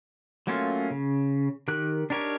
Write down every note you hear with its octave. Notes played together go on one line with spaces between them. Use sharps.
F#3 A3 A#3 C#4 F4
C#3
D#3 G4 A#4 F#6
D4 D#4 G4 A#4 C#5